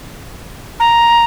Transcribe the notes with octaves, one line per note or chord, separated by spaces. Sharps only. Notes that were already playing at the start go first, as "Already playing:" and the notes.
A#5